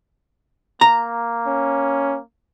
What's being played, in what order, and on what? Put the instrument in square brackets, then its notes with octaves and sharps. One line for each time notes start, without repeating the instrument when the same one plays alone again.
[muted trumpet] A#3 [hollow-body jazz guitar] A#5
[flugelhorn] C#4